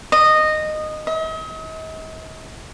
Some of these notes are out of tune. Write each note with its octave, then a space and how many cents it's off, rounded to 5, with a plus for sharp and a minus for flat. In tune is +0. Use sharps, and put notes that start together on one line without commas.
D#5 -15
D#5 +45